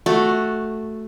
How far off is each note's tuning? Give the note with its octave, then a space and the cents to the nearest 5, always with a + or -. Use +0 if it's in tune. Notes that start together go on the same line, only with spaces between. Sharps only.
A3 +0 F#4 +0